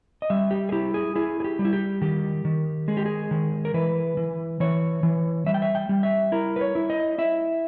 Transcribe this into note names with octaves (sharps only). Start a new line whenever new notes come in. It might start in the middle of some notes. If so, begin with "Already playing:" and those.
D#5
G3 E5
G4
G#4
E4 G4
G#4
E4 G#4
G#4
G4
G3
E4
G4
D#3 G4
D#3
G#3 G#4
G4
G#4
D#3
A#4
E3 B4
E3
E3 C#5
E3
G3 E5
G5
E5
G5
G3
E5
E4 A#4
B4
C#5
E4
D#5
E4 E5